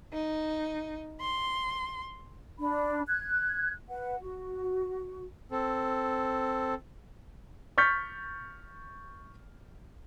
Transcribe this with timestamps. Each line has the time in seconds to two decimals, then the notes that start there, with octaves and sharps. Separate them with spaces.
0.13 D#4
1.21 C6
2.59 D4 B5
3.08 F#6 G#6
3.90 B4 F#5
4.21 F#4
5.51 C4 A4
7.78 C#6 F6 G6 A6 B6